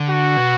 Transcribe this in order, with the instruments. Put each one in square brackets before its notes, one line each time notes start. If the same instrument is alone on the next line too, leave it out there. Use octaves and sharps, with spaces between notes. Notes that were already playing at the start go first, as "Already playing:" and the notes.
Already playing: [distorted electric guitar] D3
[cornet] F#4
[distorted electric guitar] B2